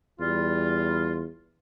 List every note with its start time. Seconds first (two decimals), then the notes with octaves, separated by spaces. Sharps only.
0.20 E2 G3 F4